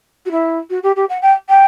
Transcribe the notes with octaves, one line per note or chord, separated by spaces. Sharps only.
F#4
E4
F#4
G4
G4
F#5
G5
G5